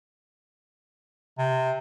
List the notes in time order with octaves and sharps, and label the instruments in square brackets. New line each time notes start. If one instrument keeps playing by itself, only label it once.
[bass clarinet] C3